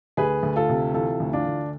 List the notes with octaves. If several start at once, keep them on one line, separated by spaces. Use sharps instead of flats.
D2 G#4 B4
D2
F4 A4
C3
E3 F4 A4
D2
D4 F4
D2